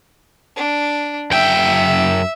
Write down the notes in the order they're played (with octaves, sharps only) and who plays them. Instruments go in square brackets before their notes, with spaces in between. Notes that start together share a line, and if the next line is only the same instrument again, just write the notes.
[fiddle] D4
[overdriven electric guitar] F#2 G5 [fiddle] E5